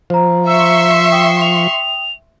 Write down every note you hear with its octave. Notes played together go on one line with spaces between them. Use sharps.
F3 C5 A#5
E5 C6 C#6 E6
G5 D#6
F7